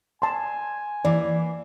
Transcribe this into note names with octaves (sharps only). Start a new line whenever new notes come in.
G#5 A5 C6
E3 A#3 D5